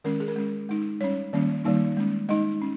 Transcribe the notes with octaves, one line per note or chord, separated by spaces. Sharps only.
D#3 G#3 C#4 A#4
G#4
A#4
G#3 C#4
G#3 D#4
G3 C#4 C#5
D#3 G3 A#3 C#4
D#3 G3 A#3 D#4
G#3 C#4
G#3 D#4 D#5
C#4